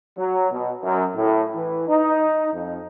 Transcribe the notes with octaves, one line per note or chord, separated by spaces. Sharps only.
F#3
B2
F#2
A2
E3
D#4
F2